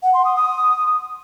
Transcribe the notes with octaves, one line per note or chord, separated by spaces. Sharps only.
F#5
C6
D#6
D#6